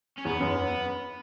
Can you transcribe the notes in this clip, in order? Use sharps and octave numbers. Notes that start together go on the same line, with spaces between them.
C#4
E2 B3
F#2